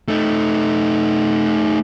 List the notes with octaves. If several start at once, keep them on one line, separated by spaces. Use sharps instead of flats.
A3 D#4